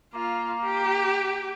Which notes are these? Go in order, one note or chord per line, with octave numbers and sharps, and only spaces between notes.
A#3 F4
G4